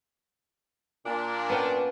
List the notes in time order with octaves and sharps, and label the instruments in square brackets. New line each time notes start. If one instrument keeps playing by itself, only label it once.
[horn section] A#2 D4
[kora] B3 C#4 G5